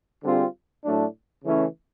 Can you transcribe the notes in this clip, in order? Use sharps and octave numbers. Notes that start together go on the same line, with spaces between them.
D3 G3 C4 F4 G#4
A2 F#3 A3 D4
C#3 E3 A3 C#4 E4